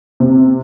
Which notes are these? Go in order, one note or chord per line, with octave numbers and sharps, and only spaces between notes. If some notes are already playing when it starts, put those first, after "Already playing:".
C3